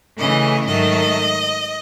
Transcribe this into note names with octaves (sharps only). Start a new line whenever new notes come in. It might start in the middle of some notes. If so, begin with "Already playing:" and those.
C#3 E3 A3 C#4 D#5
G#2 D#3 F#3 A3 D#5